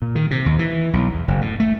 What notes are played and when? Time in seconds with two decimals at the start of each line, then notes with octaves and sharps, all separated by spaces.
0.02 A#2
0.15 D#3
0.31 C3
0.46 D#2
0.59 E3
0.93 B1
1.13 E2
1.28 F#1
1.41 A2
1.60 A3